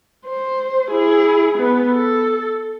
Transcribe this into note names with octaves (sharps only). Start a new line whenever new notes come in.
C5
E4 G#4
B3
A4